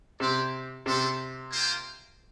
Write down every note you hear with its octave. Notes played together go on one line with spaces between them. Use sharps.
C3 E4 G4 D5
C3 G3 D4 A4
A#3 F4 C5 G5